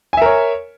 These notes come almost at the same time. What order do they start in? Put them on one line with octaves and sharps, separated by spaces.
G#5 E5 A#4 C#5